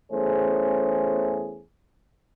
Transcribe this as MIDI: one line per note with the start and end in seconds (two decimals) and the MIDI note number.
0.12 1.62 40
0.12 1.62 57
0.12 1.62 61
0.12 1.62 68
0.12 1.62 72